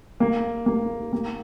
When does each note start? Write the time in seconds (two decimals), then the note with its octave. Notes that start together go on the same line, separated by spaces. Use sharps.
0.20 A#3
0.66 A#3
1.13 A#3